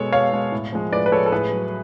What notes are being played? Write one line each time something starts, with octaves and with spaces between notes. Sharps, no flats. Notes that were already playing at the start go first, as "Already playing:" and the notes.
Already playing: B2 G#3 A4 C#5
B2 C#5 F5
G#3
A2
F3 G#3
A2 B4 D5
B4
F3 G#3 A4 C#5
A4
A2 G#4 B4
F#3